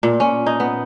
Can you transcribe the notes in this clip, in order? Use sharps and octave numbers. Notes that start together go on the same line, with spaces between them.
A#2
C#4
D#4
B3